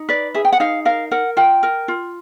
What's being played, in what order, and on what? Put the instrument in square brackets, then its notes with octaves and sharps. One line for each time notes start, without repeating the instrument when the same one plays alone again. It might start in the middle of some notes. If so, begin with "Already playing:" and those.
Already playing: [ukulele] D#4
B4 D5
G#4 E5
G5
F#5
D#4 F5
A#4 F5
A#4 F#5
F4 G5
A#4
F4